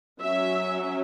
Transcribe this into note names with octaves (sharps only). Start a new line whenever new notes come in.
F#3 C#4 E5